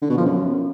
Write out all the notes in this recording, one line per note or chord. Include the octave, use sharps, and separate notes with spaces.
D3
B2
F3
F#2